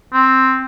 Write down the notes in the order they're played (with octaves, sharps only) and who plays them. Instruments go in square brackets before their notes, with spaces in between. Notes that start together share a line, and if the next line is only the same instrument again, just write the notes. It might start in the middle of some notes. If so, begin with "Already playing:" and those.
[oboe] C4